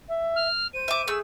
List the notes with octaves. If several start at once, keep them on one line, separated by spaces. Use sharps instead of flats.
E5
F6
C5 D#7
E5 D6
A3 G#4 E6